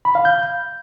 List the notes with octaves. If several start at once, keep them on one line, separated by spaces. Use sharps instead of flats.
B5
F5
G6